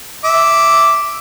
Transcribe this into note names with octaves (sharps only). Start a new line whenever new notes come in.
E5 D6